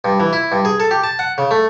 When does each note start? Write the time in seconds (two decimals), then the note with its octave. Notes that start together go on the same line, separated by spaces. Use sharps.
0.05 G2
0.20 E3
0.33 E4
0.52 G2
0.65 G#4
0.80 A4
0.91 G4
1.04 A5
1.19 F#5
1.38 C#3
1.51 A3